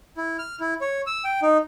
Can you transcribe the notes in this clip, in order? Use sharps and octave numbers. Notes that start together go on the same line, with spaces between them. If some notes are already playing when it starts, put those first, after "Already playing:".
E4
F6
E4
C#5
E6
G5
D#4